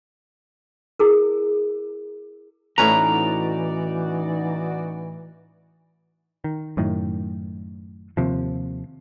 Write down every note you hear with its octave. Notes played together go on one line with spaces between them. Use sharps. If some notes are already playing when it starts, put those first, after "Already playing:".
E4 G#4 A#4
A2 E3 C#4 D#4 F#4 B4 D5 A#5
D#3
F#2 A2 D#3
D#2 C3 F3